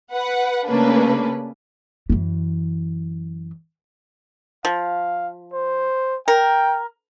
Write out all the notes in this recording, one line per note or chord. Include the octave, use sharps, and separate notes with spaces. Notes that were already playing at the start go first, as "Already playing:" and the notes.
B4 F#5
C#3 A3 A#3 C#4 D4 B4
F#2 E3
F3 F5
C5
A#4 G5